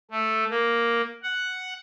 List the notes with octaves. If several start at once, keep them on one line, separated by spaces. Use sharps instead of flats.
A3
A#3
F#5